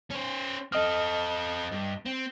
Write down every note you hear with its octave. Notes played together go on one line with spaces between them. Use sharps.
C#4 C5
C4 A4 D#5 D#6 F6
G2
C4